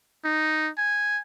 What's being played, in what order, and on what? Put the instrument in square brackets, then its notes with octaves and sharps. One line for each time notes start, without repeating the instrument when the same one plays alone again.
[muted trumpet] D#4
G#5